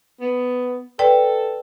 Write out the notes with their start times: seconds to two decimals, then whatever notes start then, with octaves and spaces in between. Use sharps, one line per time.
0.21 B3
0.99 A4 B4 D5 G5